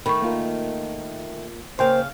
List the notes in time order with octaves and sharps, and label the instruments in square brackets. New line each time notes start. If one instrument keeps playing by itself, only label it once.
[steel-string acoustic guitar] D#3 A3 [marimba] B5 C#6
[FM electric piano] A#3 F4 A#4
[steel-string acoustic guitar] C#3 F5 [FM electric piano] A#3 G5 C6 [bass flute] C5